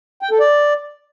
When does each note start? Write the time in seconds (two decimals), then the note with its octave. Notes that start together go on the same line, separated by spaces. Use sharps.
0.22 G5
0.31 A4
0.40 D5